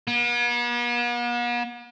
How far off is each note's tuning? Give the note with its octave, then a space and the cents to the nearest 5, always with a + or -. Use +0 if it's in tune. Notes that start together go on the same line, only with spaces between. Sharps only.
B3 -45